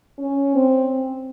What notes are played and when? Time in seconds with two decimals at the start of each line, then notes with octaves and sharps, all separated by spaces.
0.18 C#4
0.55 C4